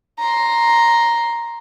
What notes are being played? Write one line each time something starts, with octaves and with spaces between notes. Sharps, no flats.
A#5 C6